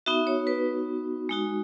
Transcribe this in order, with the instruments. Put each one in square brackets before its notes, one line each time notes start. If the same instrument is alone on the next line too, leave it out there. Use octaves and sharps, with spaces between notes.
[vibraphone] B3 D#4 F#4 E5
C#5
B4
G#3 D#4 F#4